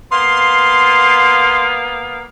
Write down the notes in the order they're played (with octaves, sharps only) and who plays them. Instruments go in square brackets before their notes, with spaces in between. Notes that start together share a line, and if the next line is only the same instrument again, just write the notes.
[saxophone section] A#3 B3 F5 [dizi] C6